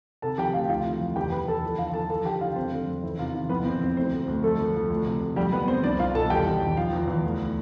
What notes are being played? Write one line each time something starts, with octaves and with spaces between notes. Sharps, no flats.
C3 A4 A5
F3 G4 G5
D2 F4 F5
C3 F4 F5
E3
F2
E2 G4 G5
E2 B4 B5
E2 A4 A5
F3
D3 F4 F5
F3 A4 A5
F3 A4 A5
D3 G4 G5
D3 F4 F5
F2 C4 C5
D3
F2
E2 E4
C3 F4
E3 F4
F2 B3 B4
E3 C4 C5
F2 C4 C5
D2 C4 C5
D2
D2
F2 A3 A4
F3
F3
D2
C3
D2
F2 G3 G4
F2 B3 B4
F3 C4 C5
C2 D4 D5
C2 F4 F5
B2 A4 A5
E2 G4 G5
E2
E2
F3 F4 F5
E2
E2
D2